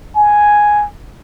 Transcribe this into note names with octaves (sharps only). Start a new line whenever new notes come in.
G#5